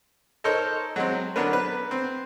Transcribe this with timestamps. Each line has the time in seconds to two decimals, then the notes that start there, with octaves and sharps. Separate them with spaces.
0.44 D#4 A4 A#4 C5 C#5 D#5
0.96 F#3 G#3 C4
1.36 D3 F#3 B3 D4 A#4 B4
1.53 B4
1.91 C4